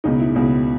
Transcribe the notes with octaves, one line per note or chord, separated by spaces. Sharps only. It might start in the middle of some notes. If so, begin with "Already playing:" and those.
C#2 B2 D#4
E4
C#2 B2